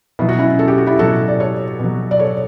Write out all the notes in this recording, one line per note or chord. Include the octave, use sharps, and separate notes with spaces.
B2 F#3 E4
F#4
C#4 E4
A4
G4
F#4
E4 G4
B2 F#3 F#4 A4
D5
A4 C#5
B2 F#3
D5
A4 C#5